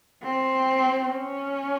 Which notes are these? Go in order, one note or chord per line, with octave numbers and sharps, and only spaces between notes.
C4
C#4